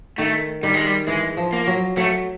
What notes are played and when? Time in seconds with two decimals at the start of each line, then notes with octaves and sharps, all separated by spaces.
0.18 D#3 A3
0.63 D#3 G3
0.74 G#3
0.85 G3
1.07 E3 G#3
1.37 F3
1.53 A#3
1.67 F#3
1.97 F#3 A3